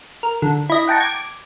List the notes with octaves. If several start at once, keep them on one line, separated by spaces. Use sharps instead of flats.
A#4
D3
E4 D#5
F#5 G5 A5 A#5 C#6
D6 G#6